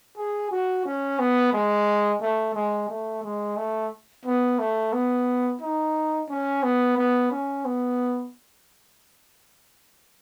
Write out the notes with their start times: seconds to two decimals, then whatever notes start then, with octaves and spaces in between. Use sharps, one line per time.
0.17 G#4
0.51 F#4
0.86 C#4
1.20 B3
1.53 G#3
2.21 A3
2.55 G#3
2.89 A3
3.24 G#3
3.57 A3
4.26 B3
4.59 A3
4.93 B3
5.61 D#4
6.29 C#4
6.63 B3
6.97 B3
7.31 C#4
7.65 B3